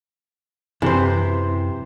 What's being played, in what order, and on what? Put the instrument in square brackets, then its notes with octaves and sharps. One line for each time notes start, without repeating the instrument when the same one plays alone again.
[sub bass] F#2 [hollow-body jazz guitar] C3 [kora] E3 C5